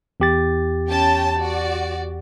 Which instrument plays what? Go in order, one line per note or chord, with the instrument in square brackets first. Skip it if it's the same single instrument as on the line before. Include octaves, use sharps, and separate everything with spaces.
[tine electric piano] E2 G4 A6
[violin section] C#4 G5 A5
F#4 D5